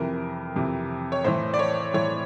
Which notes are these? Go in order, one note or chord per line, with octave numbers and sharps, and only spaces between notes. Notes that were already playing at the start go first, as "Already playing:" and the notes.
Already playing: F2 C3 E3 A#4
F2 C3 E3
C#5
A2 E3 C5
D5
C#5
A2 E3 C#5